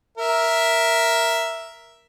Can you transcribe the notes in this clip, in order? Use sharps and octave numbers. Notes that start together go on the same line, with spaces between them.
A#4 E5